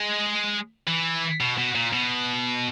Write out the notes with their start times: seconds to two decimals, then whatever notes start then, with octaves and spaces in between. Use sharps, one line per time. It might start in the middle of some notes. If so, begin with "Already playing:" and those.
Already playing: G#3
0.88 E3
1.41 B2
1.58 B2
1.75 A#2
1.93 B2